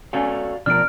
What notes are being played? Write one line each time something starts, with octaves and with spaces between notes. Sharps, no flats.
A3 C#4 F#4 D5 F5
B2 F3 D4 A#4 F6 D7